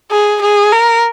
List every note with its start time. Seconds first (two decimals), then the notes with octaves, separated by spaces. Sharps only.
0.11 G#4
0.41 G#4
0.72 A#4